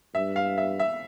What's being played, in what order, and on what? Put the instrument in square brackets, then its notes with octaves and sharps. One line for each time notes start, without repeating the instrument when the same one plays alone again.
[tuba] G2 [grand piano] E5
[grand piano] F5
E5
E5